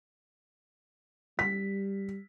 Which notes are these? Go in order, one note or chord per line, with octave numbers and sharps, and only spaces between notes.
G3 B6